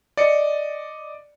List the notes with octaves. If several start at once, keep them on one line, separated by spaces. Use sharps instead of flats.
D5 D#5 C#7